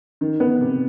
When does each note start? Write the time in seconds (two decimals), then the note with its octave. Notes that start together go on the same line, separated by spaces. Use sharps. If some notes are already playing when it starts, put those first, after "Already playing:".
0.21 D#3
0.40 B3
0.61 C3